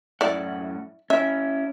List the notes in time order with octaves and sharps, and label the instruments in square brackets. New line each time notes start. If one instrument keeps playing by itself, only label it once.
[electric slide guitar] F#2 A2 F#5 [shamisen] E4 D5
[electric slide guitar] C#4 E4 [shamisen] E5